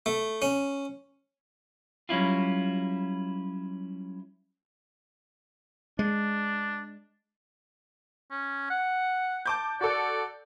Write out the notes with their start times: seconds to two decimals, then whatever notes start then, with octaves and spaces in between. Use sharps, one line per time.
0.06 A3
0.42 C#4
2.09 F#3 G3 C#4 E4 F4
5.99 G#3 D4
8.31 C#4
8.70 F#5
9.46 A5 D6 G6
9.81 F#4 A4 D5